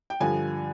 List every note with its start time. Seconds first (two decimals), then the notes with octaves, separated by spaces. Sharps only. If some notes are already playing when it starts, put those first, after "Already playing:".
0.10 G5
0.20 G2 D3 F3 G#5